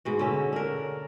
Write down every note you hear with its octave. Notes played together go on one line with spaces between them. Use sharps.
G#2 B2 F#4
D3 C#4 E5
D4 A#4